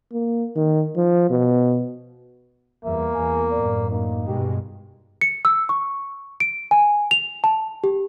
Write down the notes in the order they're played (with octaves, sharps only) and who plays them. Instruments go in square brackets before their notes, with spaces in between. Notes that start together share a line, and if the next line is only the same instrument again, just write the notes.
[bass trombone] A#3
D#3
F3
B2
[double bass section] E2 G3 [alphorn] A#3 [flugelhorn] E5
[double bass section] E2 [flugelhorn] G#5
[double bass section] F#2 A2 [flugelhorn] D5
[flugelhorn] A#3 [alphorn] D#4
[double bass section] G2 B2 G#3 [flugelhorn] G4
[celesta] C#7
E6
C#6
D7
G#5
F7
A5
G4